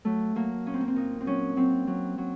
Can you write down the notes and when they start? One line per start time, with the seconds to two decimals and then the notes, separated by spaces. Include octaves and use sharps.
0.05 F#3 A3
0.35 F#3 A#3
0.66 A#2 C#4
0.74 C4
0.81 A#3
0.88 C4
0.96 A#2 D#4
1.21 C4
1.26 F#3 C#4
1.56 F#3 C4
1.87 F#3
2.18 F#3